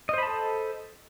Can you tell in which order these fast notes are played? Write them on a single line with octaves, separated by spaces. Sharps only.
D#5 C5 B5 A5 A4